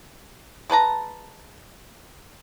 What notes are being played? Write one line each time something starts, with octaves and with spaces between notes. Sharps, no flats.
G#3 B4 A5 A#5